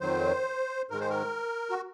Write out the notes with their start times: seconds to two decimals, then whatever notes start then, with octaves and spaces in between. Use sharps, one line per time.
0.01 F2 D#3 F#3 C5
0.90 G#2 D#3 G#3 A#4
1.00 C5
1.09 A#4
1.70 F#4